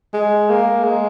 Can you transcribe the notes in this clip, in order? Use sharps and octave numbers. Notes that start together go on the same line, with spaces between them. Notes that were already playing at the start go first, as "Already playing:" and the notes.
G#3
A#3
G#3